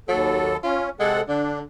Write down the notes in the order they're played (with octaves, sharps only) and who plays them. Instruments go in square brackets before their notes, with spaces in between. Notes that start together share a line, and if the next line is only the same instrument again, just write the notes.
[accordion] D#2 A4 [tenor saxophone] F#3
[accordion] C#4 [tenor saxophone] F4
[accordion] C3 A4 F#5 [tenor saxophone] G#3
[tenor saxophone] D3 [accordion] D4